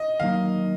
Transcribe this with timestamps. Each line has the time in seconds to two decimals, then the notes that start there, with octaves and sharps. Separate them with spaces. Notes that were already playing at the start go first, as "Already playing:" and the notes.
Already playing: D#5
0.20 D#3 F#3 A#3 D#4 F5